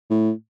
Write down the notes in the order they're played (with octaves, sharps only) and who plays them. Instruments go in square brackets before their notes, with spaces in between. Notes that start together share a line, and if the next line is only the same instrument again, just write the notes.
[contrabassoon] A2